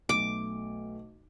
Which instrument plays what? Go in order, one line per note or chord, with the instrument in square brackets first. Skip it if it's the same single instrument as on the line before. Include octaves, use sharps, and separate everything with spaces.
[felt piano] B1 A3 [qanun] D6